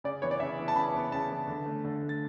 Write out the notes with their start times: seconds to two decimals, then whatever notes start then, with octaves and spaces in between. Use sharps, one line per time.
0.04 C#3 D5
0.22 E3 B3 C#5
0.31 D5
0.40 C#3 E5
0.59 E3 B3
0.68 A5
0.76 C#3 B5
0.94 E3 B3
1.12 C#3 A5
1.30 E3 B3
1.48 D3
1.66 A3
1.85 D3
2.03 A3
2.09 A6